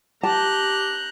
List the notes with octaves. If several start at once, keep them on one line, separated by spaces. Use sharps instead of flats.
G4 A5 A#5 F#6 G6